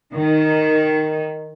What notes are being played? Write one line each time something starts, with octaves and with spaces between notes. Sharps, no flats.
D#3